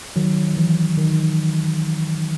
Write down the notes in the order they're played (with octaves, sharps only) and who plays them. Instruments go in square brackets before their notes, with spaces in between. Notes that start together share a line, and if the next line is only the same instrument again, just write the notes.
[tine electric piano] D#3 F#3
E3
D#3